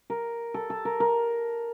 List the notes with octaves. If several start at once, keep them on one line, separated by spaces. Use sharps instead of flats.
A#4
A4
A4
A#4
A#4